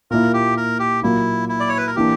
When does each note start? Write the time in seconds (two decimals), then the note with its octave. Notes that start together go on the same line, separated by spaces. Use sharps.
0.11 A#2 A#3 E4 A#4
0.34 G4
0.57 A#4
0.79 G4
1.02 A#2 F#3 A#3 E4
1.49 E4
1.60 D5
1.69 C#5
1.77 B4
1.87 A#4
1.96 E3 A#3 D4 G4